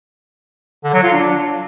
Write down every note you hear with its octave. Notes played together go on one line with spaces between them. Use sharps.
D3
F#3
F4
D4